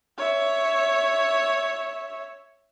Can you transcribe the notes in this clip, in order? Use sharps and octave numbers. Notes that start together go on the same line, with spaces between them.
C#5 E5